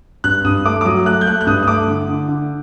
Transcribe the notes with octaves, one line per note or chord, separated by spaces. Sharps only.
G2 F#6
G2 D#6
A3 D6
D6
F#3 D#6
A3 F#6
G6
A3 F#6
F#6
G2 D#6
D#6
A3 D6
D3
D3
D3